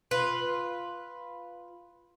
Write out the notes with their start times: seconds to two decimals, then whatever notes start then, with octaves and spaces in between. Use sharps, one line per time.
0.11 F4 B4